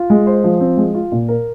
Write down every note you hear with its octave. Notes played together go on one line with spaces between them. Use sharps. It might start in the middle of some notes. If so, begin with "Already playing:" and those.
Already playing: F4
G#3
C5
F3
C4
G#3
F4
A#2
A#4